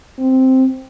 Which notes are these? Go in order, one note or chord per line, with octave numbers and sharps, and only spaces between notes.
C4